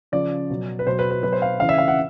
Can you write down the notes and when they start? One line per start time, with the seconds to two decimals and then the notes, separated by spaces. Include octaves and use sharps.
0.12 C#3 F3 D5
0.50 B2 F#3
0.79 B4
0.87 B2 F#3 C5
0.99 B4
1.11 B4
1.23 B2 F#3 B4
1.32 C5
1.42 F5
1.60 C#3 E3 F5
1.69 E5
1.78 F5
1.88 F#5